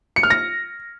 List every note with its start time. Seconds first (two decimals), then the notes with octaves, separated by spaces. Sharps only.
0.16 C#7
0.23 F6
0.30 A#6